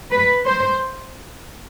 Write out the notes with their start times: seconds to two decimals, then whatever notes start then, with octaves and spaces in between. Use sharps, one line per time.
0.12 B4
0.46 C5